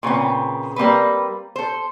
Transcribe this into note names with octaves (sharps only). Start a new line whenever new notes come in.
A#2 C#3 B3 C4
G3 A#3 C4 B4
A4 C5